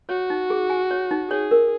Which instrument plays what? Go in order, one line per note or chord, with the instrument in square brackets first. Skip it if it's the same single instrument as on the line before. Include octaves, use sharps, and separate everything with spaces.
[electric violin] F#4 [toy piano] C#5
[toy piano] D#4
G#4
G#5
C#5
D#4
[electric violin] G#4 [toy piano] C#5
[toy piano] A#4